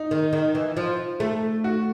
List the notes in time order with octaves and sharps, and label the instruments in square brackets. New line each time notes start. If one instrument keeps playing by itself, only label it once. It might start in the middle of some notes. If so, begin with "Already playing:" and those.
Already playing: [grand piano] D#4
[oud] D#3
D#3
E3
F3
A3
[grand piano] F#4